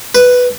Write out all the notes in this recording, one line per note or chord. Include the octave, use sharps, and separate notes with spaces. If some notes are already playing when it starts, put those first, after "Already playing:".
B4